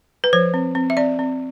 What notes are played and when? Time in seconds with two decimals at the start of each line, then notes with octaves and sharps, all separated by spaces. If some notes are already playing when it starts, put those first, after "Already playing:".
0.24 B4
0.33 F3 C5
0.54 C4
0.75 C4
0.90 E5
0.97 C4 D5
1.19 C4